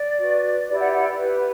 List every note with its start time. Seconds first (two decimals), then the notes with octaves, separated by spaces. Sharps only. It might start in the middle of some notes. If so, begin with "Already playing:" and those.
Already playing: D5
0.18 F#4 B4
0.67 E4 G4 B4 D5
0.79 D5 F#5
0.91 D5 F#5
1.17 E4 G4 B4